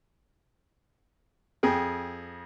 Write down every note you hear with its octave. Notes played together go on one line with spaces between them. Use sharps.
F2 G#4 G5